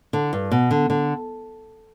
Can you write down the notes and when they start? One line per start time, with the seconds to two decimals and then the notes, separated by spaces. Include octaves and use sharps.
0.13 D3
0.33 G2
0.51 B2
0.71 D3
0.90 D3